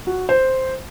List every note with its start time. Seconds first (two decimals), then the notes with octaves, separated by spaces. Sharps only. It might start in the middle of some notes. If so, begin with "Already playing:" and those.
0.07 F#4
0.29 C5